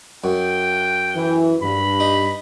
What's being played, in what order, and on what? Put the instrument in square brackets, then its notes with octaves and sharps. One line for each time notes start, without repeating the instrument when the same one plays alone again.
[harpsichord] F#2 [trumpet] G5
[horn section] E3
[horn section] G2 [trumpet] B5
[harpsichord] D#4